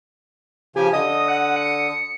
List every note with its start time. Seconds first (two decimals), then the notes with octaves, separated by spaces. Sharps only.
0.76 C#3 F3 G4 G#5
0.93 D3 D#5 D#6
1.28 F#5
1.56 C#7